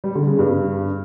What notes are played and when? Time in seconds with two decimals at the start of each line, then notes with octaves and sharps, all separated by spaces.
0.04 G3
0.15 D3
0.27 C#3
0.39 G2